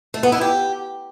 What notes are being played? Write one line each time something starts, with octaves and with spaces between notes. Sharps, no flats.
A3
B3
E4
G4